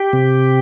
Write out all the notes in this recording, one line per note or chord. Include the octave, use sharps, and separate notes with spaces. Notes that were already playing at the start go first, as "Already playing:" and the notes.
Already playing: G4
C3